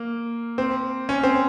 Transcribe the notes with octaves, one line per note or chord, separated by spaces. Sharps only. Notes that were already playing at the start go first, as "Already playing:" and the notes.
Already playing: A#3
C4
C#4
C4